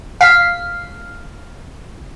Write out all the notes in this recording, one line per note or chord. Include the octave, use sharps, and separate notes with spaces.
F5 B6 C7